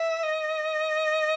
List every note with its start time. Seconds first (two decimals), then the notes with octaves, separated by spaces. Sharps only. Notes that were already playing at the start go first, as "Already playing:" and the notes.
Already playing: E5
0.23 D#5